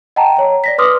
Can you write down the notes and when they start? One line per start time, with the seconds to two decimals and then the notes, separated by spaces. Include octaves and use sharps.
0.16 D#5 F#5 G5 A5 A#5
0.37 C#5 A#5
0.64 D5 A#6 B6
0.78 B4 C6 D6 D#6 F6